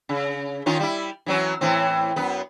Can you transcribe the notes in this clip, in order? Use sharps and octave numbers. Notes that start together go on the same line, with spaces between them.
C#3
D#3 C#4 F4
G3 E4
E3 F#3 C#4
A2 E3 C4
F#2 B3